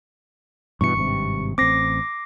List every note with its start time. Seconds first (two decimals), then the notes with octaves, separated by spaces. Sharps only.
0.81 G2 B2 E3 C#6 C#7
0.95 G#1 G2 C3
1.58 A1 C4 D6 A#6 C7